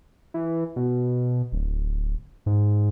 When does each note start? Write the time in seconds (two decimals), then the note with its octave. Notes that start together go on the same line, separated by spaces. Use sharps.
0.34 E3
0.76 B2
1.52 D1
2.46 G#2